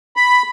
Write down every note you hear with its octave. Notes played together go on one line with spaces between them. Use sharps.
B5